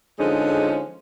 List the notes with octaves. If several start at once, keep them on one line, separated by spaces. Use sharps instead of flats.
D3 F3 G#3 C#4 D#4 G#4